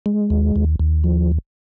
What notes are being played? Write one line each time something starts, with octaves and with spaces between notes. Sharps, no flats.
G#3
D#2
D#2
D#2
F3